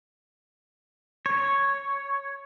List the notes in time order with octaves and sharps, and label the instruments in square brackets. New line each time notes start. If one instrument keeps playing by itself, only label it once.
[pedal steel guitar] C#5